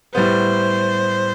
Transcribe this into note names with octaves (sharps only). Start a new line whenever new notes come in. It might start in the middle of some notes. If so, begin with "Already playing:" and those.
A2 G3 B3 C5